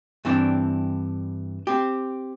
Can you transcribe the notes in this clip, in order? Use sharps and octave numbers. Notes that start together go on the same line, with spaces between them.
G2 E3 C4 D4
C4 G4